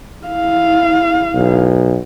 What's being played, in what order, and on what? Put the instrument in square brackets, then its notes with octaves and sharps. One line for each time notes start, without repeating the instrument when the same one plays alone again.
[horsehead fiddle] E4 F5
[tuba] B1